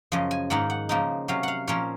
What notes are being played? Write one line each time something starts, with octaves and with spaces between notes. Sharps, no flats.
F#2 C#3 F3 D#5
G#5
G#2 D#3 A#3 D#4 F#5
F#5
C#3 F3 A#3 D#4
C3 F#3 C#4 F5
F5 F#5
A#2 F3 A#3 C#4 C#5